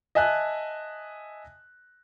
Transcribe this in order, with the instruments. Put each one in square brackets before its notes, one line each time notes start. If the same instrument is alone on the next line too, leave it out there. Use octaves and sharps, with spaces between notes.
[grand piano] D#5 E5 G#5 A5 F#6